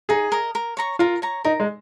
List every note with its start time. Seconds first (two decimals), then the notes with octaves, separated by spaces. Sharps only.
0.09 D#4 G#4
0.32 A#4 D#5
0.55 A#4
0.77 C#5 A#5 C#6
0.99 F4 A#4
1.22 C#5 A#5 C#6
1.44 D#4 A#4
1.60 G#3